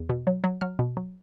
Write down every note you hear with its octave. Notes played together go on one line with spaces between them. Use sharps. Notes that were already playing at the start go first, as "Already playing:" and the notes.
Already playing: E2
B2
F#3
F#3
F#3 F6
B2
F#3